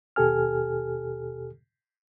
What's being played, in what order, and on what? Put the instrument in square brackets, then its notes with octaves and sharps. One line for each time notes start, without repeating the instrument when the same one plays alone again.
[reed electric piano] D#2 B2 G4 A4 G#5 F6